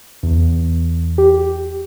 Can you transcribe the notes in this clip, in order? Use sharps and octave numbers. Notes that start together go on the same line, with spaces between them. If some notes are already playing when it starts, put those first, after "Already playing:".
E2
G4